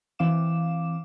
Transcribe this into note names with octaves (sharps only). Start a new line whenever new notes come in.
E3 C4 F5 D6 E7